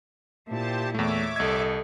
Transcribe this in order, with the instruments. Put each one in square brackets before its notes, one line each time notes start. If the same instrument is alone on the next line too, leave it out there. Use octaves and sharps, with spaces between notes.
[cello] A#2 E4 [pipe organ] G4 C5 A5
[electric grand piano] E2 A3 [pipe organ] C#5 E5 D6
[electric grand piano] C2 G#6 [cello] A4 D#5